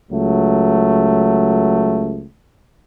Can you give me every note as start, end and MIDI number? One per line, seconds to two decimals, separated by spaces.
0.11 2.26 37
0.11 2.26 54
0.11 2.26 57